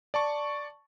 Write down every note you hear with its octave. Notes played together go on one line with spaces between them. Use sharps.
D5 A5 C#6